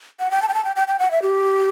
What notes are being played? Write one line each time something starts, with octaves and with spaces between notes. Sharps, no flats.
F#5
G5
A5
G5
A5
G5
G5
G5
F#5
E5
G4